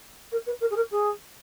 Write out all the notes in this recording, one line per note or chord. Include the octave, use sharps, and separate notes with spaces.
A#4
B4
A#4
G#4
A#4
G#4